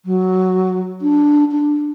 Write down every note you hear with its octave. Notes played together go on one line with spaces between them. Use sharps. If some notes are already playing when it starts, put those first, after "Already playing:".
F#3
D4
D4